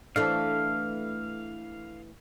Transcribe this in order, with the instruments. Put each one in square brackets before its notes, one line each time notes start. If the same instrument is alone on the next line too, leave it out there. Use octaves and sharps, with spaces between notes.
[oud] E3 A3 D4 [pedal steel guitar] F5